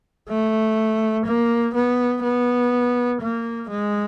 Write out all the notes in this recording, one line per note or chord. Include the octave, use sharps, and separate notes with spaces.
A3
A#3
B3
B3
A#3
G#3